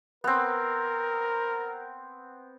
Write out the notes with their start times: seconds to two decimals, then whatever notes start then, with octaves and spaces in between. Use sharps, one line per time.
0.24 B3 C4 A#4